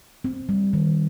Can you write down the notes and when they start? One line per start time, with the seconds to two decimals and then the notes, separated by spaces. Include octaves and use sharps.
0.24 C4
0.49 G3
0.73 D#3